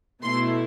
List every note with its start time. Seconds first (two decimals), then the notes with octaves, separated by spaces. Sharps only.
0.22 B2 A3 E4 C6